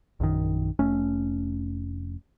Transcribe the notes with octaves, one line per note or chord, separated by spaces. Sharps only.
A#1 F#2 D#3
F1 A3 C#4